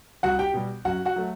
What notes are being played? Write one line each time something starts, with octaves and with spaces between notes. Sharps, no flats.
C2 F#4 F#5
G4 G5
B2 G3
F#2 F#4 F#5
F#4 F#5
F#3 A3